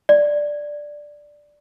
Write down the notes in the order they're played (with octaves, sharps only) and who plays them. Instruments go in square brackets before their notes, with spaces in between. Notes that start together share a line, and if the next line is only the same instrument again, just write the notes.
[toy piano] D5